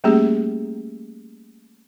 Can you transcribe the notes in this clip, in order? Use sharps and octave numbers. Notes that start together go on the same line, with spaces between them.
G3 A3 A#3 C#4 G4 G#4